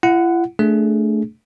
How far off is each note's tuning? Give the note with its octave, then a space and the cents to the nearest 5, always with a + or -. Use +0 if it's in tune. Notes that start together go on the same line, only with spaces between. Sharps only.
E4 +45 F#5 +0
A3 +0 D4 +0 G#4 +10